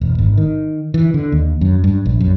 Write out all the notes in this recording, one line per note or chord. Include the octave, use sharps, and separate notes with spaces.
E1
G#1
D#3
E3
D3
D#2
F#2
G2
A#1
F#2